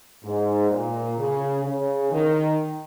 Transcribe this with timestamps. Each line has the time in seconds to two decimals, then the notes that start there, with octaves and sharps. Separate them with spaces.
0.23 G#2
0.70 A#2
1.18 C#3
1.65 C#3
2.11 D#3